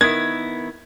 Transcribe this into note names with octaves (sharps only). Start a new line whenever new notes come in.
D#3 B3 E4 G#6